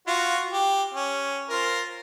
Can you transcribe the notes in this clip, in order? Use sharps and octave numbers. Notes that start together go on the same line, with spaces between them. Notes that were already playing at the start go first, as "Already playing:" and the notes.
F4 F#4
G4
C#4
F4 A#4 C5